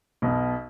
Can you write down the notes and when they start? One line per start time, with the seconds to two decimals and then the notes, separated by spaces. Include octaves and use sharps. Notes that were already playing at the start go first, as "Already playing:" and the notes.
0.22 B1 B2